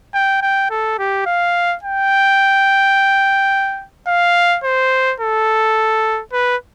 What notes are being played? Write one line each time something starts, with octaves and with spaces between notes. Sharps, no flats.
G5
G5
A4
G4
F5
G5
F5
C5
A4
B4